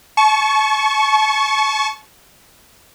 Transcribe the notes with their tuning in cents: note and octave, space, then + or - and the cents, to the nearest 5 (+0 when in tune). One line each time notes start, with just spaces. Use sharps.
A5 -35 C#6 +0